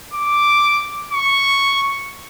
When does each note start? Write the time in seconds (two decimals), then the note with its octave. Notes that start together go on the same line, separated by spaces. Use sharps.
0.14 D6
1.13 C#6